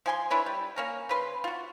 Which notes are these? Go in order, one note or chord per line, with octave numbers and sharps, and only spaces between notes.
F3 G#5 C6
D4 E4 B4 C#5
G3
A#3 C#4 A#4
C#3 B4 C6
F4 F#4